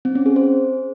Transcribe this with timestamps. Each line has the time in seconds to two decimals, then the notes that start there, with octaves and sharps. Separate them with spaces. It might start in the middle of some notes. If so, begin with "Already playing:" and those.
0.05 C4
0.15 C#4
0.26 G#4
0.36 C5